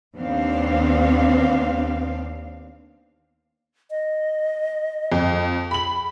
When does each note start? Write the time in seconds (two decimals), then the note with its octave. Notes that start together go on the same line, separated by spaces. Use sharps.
0.16 D#2 B3 C4 D4 F5
3.90 D#5
5.12 F2
5.71 B5 F#7